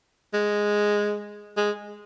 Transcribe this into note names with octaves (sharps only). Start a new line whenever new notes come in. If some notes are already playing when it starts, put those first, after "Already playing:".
G#3
G#3